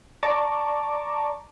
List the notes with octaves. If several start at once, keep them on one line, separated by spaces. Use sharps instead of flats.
D5 A5 A#5 C#6 D6